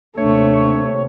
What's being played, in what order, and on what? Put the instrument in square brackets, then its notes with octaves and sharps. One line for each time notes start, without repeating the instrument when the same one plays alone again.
[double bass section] D#2 C3 [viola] A3 [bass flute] D4 [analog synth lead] C#5